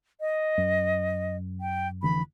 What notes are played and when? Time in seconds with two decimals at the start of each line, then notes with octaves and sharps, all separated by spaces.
0.20 D#5
0.58 F#2
1.61 G5
2.02 F1 D3 E3 B5